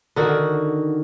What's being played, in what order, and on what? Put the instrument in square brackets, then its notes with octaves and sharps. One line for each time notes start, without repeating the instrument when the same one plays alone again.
[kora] D3 D#3 F#4